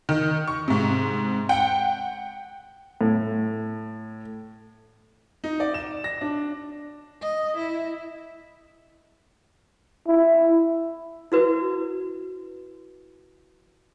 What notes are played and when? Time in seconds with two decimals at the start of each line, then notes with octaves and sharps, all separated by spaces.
0.09 D#3
0.48 C#6
0.68 G#2 C3
1.49 F#5 G5
3.01 A2
5.44 D#4
5.60 D5
5.74 E7
6.04 A#6
6.21 D4
7.21 D#5
7.58 E4
10.07 E4
11.32 E4 F#4 B4